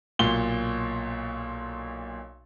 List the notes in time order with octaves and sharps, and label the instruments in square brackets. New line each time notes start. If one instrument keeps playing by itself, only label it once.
[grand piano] B1 A#2 G7